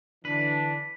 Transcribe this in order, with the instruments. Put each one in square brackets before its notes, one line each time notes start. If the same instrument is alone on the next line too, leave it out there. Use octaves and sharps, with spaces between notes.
[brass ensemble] D3 E3 D4 [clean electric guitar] B4